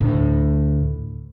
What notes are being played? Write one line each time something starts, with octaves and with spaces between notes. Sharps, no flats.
D2 A2